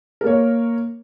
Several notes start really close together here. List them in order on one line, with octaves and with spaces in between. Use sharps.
A#4 A#3 C#5